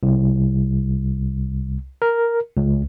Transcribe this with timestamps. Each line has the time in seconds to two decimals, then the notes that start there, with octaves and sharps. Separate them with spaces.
0.03 C2
2.02 A#4
2.57 C#2